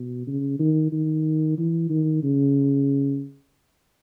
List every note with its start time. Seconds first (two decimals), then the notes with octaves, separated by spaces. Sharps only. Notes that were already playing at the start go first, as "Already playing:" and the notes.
Already playing: B2
0.27 C#3
0.59 D#3
0.92 D#3
1.58 E3
1.90 D#3
2.23 C#3